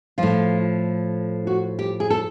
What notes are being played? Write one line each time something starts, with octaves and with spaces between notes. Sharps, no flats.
A2 F3 F4
F#4
G4
G#4
A4